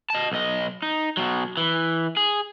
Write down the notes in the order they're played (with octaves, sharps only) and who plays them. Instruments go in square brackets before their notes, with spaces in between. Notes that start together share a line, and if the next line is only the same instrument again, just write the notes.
[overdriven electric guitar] D#5 A5
B1 D#5
D#4
B2 F#3
E3
G#4